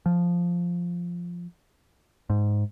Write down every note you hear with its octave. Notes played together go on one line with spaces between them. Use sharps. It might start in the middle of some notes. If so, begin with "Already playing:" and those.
F3
G#2